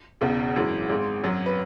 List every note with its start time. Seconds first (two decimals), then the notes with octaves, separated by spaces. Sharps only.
0.21 E1 E2 C#3
0.56 G#1 F#2 E3 G#3
0.89 G#1 G#2 G#3
1.23 G#1 F#2 F#3
1.46 B4